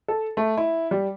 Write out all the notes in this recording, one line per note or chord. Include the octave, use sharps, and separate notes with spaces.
A4
A3
E4
G3